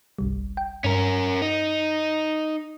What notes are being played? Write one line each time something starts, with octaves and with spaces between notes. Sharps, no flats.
G1 C2 G3
G5
G2 C#4 A#4
D#4